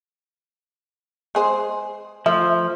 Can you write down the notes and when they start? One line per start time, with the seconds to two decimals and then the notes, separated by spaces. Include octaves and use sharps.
1.35 G#3 G#4 C5
2.26 F3 A3 E5